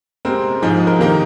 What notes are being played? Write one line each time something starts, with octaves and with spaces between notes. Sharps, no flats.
C3 G#3 C4 A#4
G#2 F3 G#3 D#4 G#4
A#4
C3 D#3 A#3 D#4